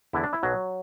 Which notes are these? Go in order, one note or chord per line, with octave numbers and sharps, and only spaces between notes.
E2 D3 E4
D4
E4
B1 B2 F#3